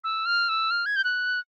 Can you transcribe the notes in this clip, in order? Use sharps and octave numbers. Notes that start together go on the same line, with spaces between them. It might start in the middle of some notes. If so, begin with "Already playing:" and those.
E6
F6
E6
F6
G#6
G6
F#6